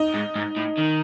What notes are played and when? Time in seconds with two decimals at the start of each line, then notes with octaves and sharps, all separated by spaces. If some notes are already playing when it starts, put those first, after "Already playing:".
Already playing: D#4
0.14 G#2
0.35 G#2
0.56 A2
0.77 D#3